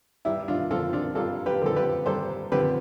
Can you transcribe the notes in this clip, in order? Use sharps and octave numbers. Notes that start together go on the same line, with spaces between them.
G2 E4
D4 F4
D3 F3 C4 F4 A4
D4 F4
G2 F4 A4
G4 B4
D3 F3 C4 A4
G4 B4
G2 A4 C5
D3 F3 C4 G4 B4